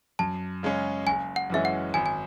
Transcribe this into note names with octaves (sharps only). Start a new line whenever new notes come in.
F#2 A5
C#3 G#3 C#4
F#1 G#5
F#5
F#2 E3 G#3 C#4 E5
F#5
G#1 G#5
G#5